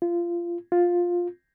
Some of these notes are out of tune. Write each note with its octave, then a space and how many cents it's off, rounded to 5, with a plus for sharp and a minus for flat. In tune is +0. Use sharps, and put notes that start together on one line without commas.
F4 -20
F4 +10